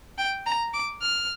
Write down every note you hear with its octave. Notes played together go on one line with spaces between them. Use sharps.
G5
A#5
D6
F6